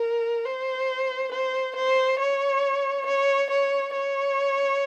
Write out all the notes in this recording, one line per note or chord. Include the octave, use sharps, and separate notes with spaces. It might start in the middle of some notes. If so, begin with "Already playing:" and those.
Already playing: A#4
C5
C5
C5
C#5
C#5
C#5
C#5